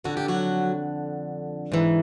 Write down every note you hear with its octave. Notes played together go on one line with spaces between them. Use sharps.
F2 D3 F#4
G4
F#3 F#4
G#2 E3